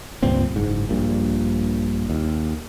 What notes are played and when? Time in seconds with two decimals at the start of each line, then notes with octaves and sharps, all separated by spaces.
0.23 C#2 G2 A#2 C4
0.54 F#1 G#2
0.89 A#1 G2 A#2
2.10 D#2